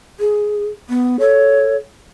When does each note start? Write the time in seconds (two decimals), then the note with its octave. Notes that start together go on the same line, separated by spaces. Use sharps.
0.20 G#4
0.89 B3
1.20 A4 C#5